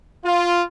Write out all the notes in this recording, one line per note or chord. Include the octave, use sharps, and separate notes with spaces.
F4